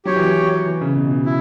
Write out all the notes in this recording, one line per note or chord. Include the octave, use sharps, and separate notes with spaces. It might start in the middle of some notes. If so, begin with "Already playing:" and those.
F#3 G4 C#5 G5
E3
F#3
E3
C#3
B2
B2
E4